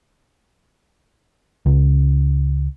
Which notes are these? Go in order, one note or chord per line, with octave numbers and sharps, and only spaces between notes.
C#2